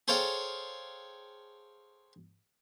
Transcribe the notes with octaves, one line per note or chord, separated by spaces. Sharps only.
G#4 A4 C5 C#5 F5 G5